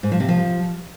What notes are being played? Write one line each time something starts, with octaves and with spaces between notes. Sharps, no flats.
G#2
F3
C3
F3